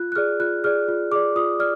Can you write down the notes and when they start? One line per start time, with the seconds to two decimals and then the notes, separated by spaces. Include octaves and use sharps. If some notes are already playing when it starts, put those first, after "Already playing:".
Already playing: F4 F#6
0.12 F#6
0.16 G#4 D5 F6
0.40 F4 F#6
0.64 G#4 D5 F6
0.88 F4
1.12 G#4 D5 D6
1.36 F4 D#6
1.59 D5 F6